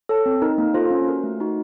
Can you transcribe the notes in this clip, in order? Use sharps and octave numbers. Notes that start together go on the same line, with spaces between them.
A4 C#5 A5
C4
D#4 A#4
A#3
F4 A4 C5
C#4
F#4 A#4
A3
D#4 F#4